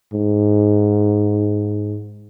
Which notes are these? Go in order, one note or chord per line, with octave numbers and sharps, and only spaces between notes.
G#2